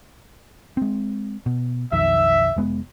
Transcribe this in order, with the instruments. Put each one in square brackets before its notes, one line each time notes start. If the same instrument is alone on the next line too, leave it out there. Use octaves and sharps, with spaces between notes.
[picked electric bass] G#3 C4
B2
[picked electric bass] B1 F2 D#3 [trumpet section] E5
[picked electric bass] F1 G#3 B3